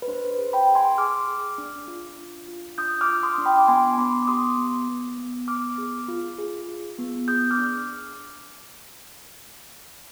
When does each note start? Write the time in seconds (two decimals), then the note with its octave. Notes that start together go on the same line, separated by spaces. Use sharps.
0.02 B4
0.08 D4 C5
0.31 C5
0.38 G#4
0.53 G5 B5
0.68 G#4
0.75 G#5 C6
0.98 G#4 D6 F6
1.28 G#4
1.58 D4
1.88 F4
2.19 D4
2.48 F4
2.78 D4 D#6 G6
3.01 D6 F6
3.08 F4
3.23 C6 D#6
3.38 D4
3.46 G5 B5
3.58 D6
3.68 B3 G#5 C6
3.98 B3 B5 D6
4.23 D6
4.28 G4 C6 D#6
4.58 B3
4.88 B3
5.18 B3
5.48 B3 D6 F6
5.78 G#4
6.08 F4
6.38 G#4
6.68 F4
6.99 B3
7.28 G#4 D#6 G6
7.51 D6 F6
7.58 D4